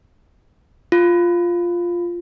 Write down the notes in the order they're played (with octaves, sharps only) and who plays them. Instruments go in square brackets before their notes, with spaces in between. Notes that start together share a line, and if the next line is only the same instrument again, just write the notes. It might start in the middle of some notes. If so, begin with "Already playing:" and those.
[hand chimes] F4